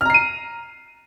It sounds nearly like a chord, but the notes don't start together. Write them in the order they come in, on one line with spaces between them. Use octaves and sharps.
F6 A#5 C7 D#7